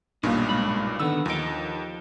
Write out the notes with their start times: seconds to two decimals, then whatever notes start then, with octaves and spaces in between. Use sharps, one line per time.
0.23 B1 G2 A#2 A#3 D#4
0.47 G#2 B5
1.00 D3 D#3 B3 E6
1.26 D#2 F3 D#4 D7